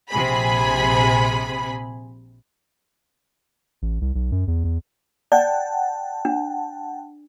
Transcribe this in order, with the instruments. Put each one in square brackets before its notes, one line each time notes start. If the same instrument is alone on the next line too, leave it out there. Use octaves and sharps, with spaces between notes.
[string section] A#1 C3 G#4 B5
[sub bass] A1
C2
B1
F#2
E2
E2
[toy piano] D5 [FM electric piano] F#5 G5 A5
[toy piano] D4